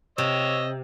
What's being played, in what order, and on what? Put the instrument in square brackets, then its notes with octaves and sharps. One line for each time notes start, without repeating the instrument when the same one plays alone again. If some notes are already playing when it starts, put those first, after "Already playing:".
[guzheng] C3 [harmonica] C#5 D#5 E6